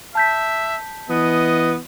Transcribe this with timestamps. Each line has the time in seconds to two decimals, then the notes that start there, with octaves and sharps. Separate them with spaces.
0.15 E5 A5 G6 B6
1.09 E3 B3 D#5